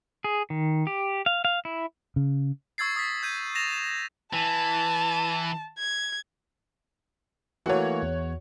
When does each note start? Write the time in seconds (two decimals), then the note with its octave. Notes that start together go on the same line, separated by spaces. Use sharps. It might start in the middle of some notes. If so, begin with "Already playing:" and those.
0.24 G#4
0.50 D#3
0.87 G4
1.26 F5
1.45 F5
1.65 E4
2.16 C#3
2.78 C#6 E6 G#6 A6 C7
2.96 D#6 A6 B6
3.23 G6 G#6 D#7
3.55 A6 A#6 E7 F7
3.72 E7
4.33 E3 A5
5.79 G#6
7.66 E3 A3 A#3 F#4 C#5
8.03 E2